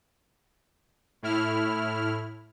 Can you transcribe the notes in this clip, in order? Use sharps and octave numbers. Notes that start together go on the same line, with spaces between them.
A2 E4 F6